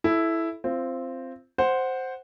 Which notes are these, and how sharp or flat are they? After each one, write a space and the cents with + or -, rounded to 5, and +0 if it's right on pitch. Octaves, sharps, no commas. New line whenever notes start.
E4 +0 A4 -20
C4 +0 F4 -25
C5 +0 F#5 +0